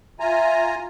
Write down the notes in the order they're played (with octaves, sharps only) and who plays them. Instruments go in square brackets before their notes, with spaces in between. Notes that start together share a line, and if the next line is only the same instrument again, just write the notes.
[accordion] F4 G#5 A#5 [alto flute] E5